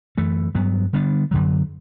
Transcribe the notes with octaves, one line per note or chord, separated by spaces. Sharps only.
F#2 E3 A3
G2 F#3 B3
D3 G3 B3 D4
F#2 D3 F#3